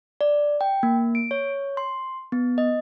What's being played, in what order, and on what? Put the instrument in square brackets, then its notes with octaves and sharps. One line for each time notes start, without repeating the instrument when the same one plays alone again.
[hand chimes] D5
G5
A#3
D7
C#5
C6
B3
D#5